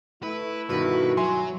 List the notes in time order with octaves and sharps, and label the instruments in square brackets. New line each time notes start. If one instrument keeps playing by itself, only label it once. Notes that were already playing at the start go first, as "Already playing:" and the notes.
[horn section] A3 E4 [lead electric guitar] B4
[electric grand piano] G2 B2 D#3 [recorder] F#4 [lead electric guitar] B4
[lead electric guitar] F#3 [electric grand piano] E5 G#5 C6